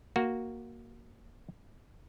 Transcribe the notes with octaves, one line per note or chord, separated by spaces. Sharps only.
A#3 F#4